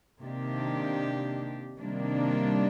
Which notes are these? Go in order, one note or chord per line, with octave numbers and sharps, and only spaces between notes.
C3 D#3 A#3 D4 G4
C3 D#3 G3 A#3 D4